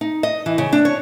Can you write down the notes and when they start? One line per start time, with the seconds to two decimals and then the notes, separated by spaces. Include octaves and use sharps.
0.01 D#4
0.23 D#5
0.46 E3
0.58 C#3
0.73 D4
0.85 C#5